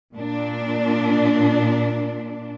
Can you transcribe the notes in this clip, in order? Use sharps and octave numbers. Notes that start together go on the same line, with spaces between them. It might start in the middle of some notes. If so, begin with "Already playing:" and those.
A#2 D4